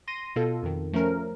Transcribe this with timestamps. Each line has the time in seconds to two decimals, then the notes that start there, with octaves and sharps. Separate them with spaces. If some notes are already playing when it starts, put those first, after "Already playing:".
0.07 C6 A#6 D#7
0.36 B2 F4 A4
0.63 F2 D#3
0.93 F3 A3 C#4 A#4